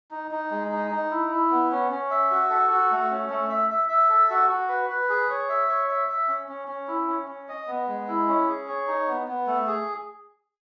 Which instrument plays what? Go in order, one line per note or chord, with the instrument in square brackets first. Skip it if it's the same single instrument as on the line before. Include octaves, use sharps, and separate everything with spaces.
[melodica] D#4
D#4
G#3
D#4
D#4
E4
E4
B3
C#4
C#4
E5
F#4
A4
F#4
A3
C#4
A3
E5
E5
E5
A4
F#4
F#4
B4
B4
G#4
C#5
E5
C#5
E5
E5
C#4
C#4
C#4
E4
C#4
C#4
D#5
B3
G#3
E4
C#4
G#4
C#5
D#4
B3
B3
A3
G#4